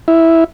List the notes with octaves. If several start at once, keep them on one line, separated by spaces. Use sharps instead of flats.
E4